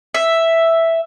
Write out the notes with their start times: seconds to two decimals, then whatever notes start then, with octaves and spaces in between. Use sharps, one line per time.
0.14 E5